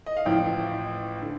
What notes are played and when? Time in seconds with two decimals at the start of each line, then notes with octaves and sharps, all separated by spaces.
0.06 D#5
0.17 F5
0.25 A1 A2 F3 G5
1.21 D3